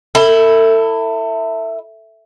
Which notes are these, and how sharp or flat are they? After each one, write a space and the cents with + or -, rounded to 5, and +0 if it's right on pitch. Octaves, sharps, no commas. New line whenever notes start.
E4 +0 A4 +35